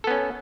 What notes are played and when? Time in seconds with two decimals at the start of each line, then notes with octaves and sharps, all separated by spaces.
0.04 A4
0.07 B3
0.11 C#4